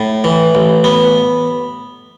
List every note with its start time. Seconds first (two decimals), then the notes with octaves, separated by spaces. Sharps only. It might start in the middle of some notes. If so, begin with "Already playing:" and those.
Already playing: A2
0.24 E3
0.55 A1
0.84 B3